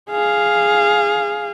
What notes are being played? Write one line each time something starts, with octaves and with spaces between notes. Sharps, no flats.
G#4 F5